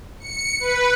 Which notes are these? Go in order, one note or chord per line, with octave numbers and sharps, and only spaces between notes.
C#7
B4